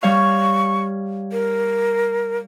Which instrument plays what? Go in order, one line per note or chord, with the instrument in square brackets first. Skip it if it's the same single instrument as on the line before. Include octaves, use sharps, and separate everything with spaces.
[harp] G3 C#5 F5 [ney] C#6
[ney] A#4